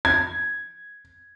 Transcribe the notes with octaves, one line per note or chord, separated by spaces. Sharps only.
G#6